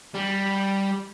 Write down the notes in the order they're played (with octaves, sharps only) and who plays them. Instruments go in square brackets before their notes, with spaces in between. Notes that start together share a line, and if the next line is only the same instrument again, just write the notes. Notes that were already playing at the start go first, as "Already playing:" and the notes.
[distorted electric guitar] G3